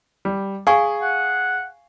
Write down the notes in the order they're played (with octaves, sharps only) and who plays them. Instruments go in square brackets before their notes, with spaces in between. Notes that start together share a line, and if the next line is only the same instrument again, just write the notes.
[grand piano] G3
[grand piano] G#4 [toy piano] F5 G#5 C#6
[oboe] F#5